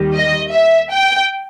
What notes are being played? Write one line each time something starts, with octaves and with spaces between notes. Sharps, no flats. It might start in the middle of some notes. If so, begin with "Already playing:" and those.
Already playing: D#2 D#3 G3
D#5
E5
G5